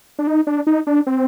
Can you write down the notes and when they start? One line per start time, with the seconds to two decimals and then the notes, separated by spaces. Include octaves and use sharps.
0.19 D4
0.27 D#4
0.47 D4
0.67 D#4
0.87 D4
1.07 C4